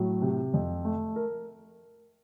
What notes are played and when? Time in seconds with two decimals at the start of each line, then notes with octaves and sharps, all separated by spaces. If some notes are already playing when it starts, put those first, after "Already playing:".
Already playing: A2 F#3
0.22 C3
0.54 F2
0.85 A3
1.16 A#4